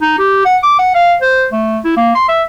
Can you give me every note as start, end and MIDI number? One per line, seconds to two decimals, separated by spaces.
0.02 0.15 63
0.19 0.45 67
0.45 0.57 78
0.63 0.75 86
0.79 0.92 78
0.95 1.15 77
1.21 1.46 72
1.52 1.79 57
1.84 1.97 64
1.97 2.14 58
2.15 2.26 84
2.29 2.43 76